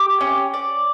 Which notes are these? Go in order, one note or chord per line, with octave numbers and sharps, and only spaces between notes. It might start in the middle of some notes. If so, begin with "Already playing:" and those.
Already playing: G4
C#4
D5